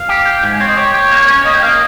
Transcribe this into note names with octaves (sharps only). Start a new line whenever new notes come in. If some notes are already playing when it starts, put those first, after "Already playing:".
Already playing: F5
G4
G4
G#2 F5
G#5
C4 C#5
D#5
G4 C#5
G4
A#3
C#4
A#3 D#5
G5
A#3 F5
D#5